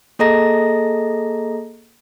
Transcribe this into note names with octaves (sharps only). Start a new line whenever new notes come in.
A#3 G#4 A4 D#5 A#5 A#6